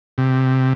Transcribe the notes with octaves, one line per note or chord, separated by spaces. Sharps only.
C3